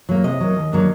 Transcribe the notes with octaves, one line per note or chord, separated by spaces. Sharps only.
F#3 A#3
C3 D#5
F#3 A#3
D#2
D3 F#3 A#3 D4